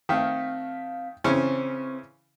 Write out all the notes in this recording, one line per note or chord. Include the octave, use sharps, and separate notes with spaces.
D#3 A3 C4 F5 B6
C#3 E3 C4 C#4 C5